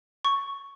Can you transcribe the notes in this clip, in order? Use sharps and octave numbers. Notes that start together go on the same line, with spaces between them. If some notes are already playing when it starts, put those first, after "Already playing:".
C#6